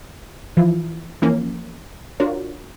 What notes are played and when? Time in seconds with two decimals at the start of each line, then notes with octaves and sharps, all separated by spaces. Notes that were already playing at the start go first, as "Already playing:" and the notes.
0.57 E3 F3 E4 F4
1.22 E3 F3 A#3 C#4
2.20 D4 F4 F#4 A#4 C#5